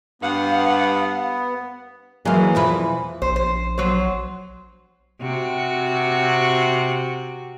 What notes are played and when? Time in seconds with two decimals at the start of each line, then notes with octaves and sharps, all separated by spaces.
0.22 G2 B3 F5 F#5
2.25 E3 F#3 G#3 A#3 F5
2.55 E2 B2 F3 B4
3.22 A#1 C5
3.36 C5
3.78 F#3 C5
5.21 C3 F#4